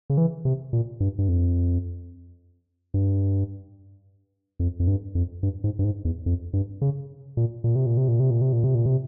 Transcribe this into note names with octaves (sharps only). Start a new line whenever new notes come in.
C#3
E3
C3
A#2
G2
G2
F2
G2
F2
F2
G2
F2
G2
G#2
G2
G#2
E2
F2
G2
C#3
A#2
A#2
C3
A#2
C3
A#2
C3
A#2
C3
A#2
C3
A#2
C3